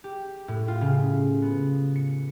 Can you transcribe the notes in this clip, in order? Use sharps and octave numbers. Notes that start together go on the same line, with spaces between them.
G4
A2
F4
C#3
B3
C#7